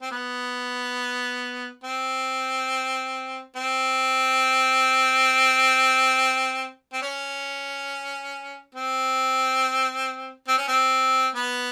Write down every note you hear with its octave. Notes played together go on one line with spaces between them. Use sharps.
C4
B3
C4
C4
C4
C#4
C4
C4
C#4
C4
B3